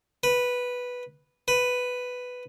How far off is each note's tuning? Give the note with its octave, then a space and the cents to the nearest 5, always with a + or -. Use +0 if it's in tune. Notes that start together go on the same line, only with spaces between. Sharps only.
B4 -5
B4 +5